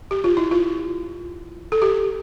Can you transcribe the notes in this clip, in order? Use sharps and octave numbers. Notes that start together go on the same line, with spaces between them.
G4
F4
E4
F4
A4
G4